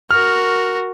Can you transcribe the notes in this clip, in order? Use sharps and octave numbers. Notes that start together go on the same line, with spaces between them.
F#4 A#4 F6